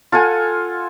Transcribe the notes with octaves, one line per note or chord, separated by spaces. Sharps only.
F4 A4 F#5 G#5